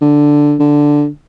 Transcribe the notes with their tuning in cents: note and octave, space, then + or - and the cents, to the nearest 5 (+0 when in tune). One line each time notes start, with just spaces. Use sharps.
D3 +0
D3 +0